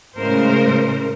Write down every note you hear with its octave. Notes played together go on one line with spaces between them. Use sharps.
A2 C#3 G#3 A#4 C5